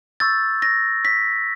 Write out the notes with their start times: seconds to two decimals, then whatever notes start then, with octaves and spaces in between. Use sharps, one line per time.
0.20 C#6 E6 G6 A6
0.62 A#6
1.05 B6